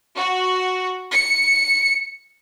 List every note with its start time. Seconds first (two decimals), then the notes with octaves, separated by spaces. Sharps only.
0.16 F#4
1.12 C#7